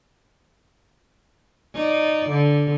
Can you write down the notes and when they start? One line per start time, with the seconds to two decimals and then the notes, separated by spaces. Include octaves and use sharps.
1.75 D#4 D5
2.30 D3